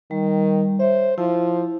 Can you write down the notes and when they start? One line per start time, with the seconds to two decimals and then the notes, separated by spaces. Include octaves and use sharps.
0.11 D#3 G3
0.80 C5 C#5 E5
1.18 F3 E4